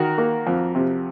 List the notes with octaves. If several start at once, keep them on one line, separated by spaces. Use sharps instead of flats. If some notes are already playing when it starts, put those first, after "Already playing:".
Already playing: D#3 F#4 A#4
A#3
F2
C3